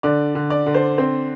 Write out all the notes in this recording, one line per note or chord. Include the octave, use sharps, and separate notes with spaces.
D3 D5
D3
D5
D3
C5
C4 C5